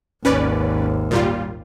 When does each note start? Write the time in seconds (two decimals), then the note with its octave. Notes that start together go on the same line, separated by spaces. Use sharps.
0.25 G#1 D#2 C#4 B4 D5
1.11 A#2 G3 F4